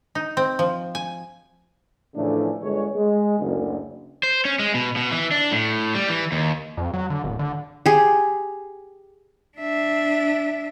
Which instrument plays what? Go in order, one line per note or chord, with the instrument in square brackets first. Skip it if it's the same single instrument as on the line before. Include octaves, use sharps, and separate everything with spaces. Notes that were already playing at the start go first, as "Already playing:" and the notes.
[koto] D#4
C4
F3
G#5
[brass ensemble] A2 C#3 E3 F3 A3 D4
G1 G#3 C#5
G#3
F#1 D2
[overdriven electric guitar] C5
C#4
G#3
B2
B2
E3
D4
A2
G3
E3
D#2
[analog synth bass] F2
F#3
D3
D1
D3
[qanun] G4 G#4
[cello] D4 E5